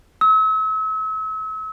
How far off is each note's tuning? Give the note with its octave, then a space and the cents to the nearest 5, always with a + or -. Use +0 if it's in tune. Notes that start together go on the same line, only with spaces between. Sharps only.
E6 -40